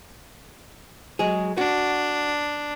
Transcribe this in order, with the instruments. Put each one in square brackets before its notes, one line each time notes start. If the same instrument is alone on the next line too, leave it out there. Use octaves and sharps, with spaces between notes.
[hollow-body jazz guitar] F#3 G#3 G#4
[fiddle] D4 [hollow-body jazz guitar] F#4